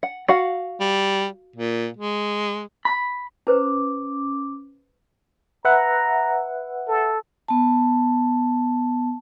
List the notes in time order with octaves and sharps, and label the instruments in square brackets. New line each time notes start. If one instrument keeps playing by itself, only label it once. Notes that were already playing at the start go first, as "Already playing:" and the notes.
[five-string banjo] F#5
F#4 F5 F#5
[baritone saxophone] G3
A#2
G#3
[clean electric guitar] B5
[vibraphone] C#4 D6 [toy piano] E4 B4 C5
[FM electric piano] B4 E5 F#5 [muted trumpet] A#5
[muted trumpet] A4
[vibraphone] B3 A5